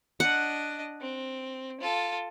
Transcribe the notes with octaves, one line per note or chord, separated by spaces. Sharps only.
D4 D#5 F#5
C4
F4 A4